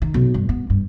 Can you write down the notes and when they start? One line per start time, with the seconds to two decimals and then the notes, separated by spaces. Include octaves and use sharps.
0.02 D#3
0.14 B1
0.34 G2
0.49 B3
0.70 G2